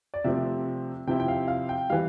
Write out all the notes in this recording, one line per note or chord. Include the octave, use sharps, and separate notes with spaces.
D5
C3 F3 A3 C4 E5
C3 F3 C4 E4 G5
G5
F5
F5
G5
E3 G3 F5